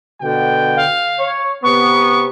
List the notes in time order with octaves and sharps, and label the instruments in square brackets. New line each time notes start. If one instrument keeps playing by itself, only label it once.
[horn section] B2 D3 G5
[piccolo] F5
[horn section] C#5
[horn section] C3 B3 [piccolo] C#6